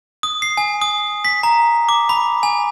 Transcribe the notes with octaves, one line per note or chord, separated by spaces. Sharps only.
D#6
C7
G#5
D#6
B6
A#5
D6
B5
G#5